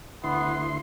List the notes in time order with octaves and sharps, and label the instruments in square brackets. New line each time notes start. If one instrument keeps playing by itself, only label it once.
[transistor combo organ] D2 E4 C6 [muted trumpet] B3